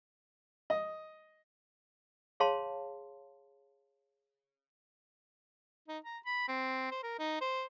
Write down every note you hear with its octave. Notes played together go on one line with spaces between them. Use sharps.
D#5
G#4 C#5 F5 A5 C6
D#4
A#5
B5
C4
C5
A#4
D#4
C5